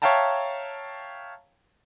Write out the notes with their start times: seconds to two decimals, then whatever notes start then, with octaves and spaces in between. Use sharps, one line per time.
0.02 C#5 E5 F5 G5 A5 A#5